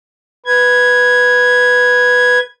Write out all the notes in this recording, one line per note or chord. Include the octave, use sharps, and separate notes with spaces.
B4 G#6